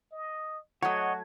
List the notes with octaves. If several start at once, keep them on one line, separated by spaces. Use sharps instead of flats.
D#5
F#3 A3 F#4 C#5 D#5 F#5 G#6